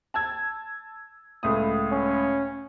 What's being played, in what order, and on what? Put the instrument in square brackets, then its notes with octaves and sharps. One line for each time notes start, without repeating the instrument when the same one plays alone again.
[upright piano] A5 E6 G#6
C#2 A2 D#6
[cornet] C#4